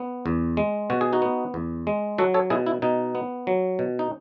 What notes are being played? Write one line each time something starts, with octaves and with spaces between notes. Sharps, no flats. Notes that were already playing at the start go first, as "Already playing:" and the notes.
Already playing: B3
E2
G#3
B2 F#4
G#4
D#4 F#4
B3
E2
G#3
F#3 F#4 A4
A4 C#5
B2 E4 G#4
E4
B2 D#4
B3
F#3
B2
D#4